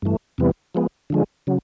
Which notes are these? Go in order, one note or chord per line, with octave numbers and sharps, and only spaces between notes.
G2 E3 A3
E2 C3 E3 G3 B3
F3 G#3 B3
D3 F3 G#3
C#3 F#3